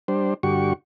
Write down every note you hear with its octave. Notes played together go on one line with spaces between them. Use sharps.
G3 D4 C5
G2 D3 F#4 G4 C#6